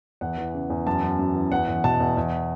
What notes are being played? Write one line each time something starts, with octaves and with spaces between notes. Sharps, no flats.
E2 F#5
E3
C#3
E2
F#2 A5
F#2
F#2
E3
E2 F#5
E2
B2 A5
E2
E2